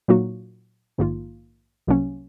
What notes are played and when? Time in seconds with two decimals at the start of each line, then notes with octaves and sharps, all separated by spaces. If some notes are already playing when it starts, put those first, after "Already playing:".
0.08 A#2 F#3 A#3 D#4 F#4
0.98 A#1 G#2 D#3 A#3 F4
1.87 C2 C3 F#3 A#3 C#4